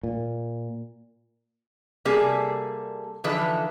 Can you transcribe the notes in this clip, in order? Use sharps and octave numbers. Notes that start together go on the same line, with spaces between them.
A#2
C3 G3 A#3 G#4 A4
D3 E3 F3 D#4 A4 B4